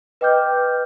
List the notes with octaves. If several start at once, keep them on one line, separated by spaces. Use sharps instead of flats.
B4 D#5 G5 D6 F6 G6